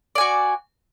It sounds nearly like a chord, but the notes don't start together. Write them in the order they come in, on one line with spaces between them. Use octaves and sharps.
D5 G#5 F#4